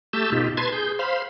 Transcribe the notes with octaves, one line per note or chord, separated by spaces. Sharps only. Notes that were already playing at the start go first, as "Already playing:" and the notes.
A3 G4 A5 E6 G6
B2 D#4 F4 G4
B4 A5 C6 G#6
G#4 G6
C5 F5 B5 C6